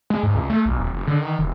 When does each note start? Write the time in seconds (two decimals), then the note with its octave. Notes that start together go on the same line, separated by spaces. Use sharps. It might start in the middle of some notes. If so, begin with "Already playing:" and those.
0.10 G#3
0.23 G#2
0.35 C#2
0.50 A3
0.65 B1
0.79 D#1
0.93 F#1
1.07 D3
1.22 D#3
1.39 E1